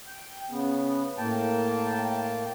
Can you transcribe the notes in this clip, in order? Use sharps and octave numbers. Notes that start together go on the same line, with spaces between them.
G5
C#3 B3
A2 A#3 G5 A5